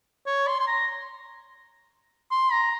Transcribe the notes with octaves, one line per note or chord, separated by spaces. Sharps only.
C#5
C6
C6
A#5
C6
A#5